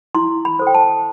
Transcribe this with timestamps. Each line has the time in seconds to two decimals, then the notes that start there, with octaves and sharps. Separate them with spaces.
0.15 E4 C6
0.45 B5
0.59 A4 C5
0.67 G5
0.74 A5